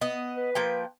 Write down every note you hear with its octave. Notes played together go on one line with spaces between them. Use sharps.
B3 D#5
B4
F3 A#3 G5